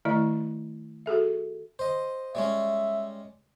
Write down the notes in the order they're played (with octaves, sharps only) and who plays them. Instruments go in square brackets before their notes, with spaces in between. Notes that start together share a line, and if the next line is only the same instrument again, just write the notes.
[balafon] D#3 A3 E4 D5 D#5
F#4 G#4 A4 E5
[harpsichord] C5 D#5
[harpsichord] G3 G#3 C#4 [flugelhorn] E5